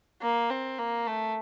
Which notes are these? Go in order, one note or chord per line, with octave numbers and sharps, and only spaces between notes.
A#3
C4
A#3
A3